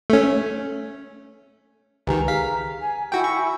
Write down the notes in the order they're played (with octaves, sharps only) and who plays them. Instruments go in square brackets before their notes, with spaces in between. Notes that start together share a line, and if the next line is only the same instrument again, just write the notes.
[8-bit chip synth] A3 C#4
[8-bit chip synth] C#2 D#3 [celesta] G4 B4 G#5 [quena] A#5
[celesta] G#4 [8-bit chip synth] F5 B6
[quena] G#5
[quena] E4 [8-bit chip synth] F#4 G5 [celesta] G#5
[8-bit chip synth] C#6